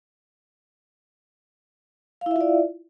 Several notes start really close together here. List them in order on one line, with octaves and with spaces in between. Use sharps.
F5 E4 E5 F4 D5